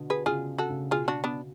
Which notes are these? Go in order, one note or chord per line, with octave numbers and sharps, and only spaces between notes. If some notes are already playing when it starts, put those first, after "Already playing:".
Already playing: B2 D3
G#4 B4
C#3 F4 G#4
F#4 A4
C#3
B2 F4 G#4
D4 F#4
B3 D4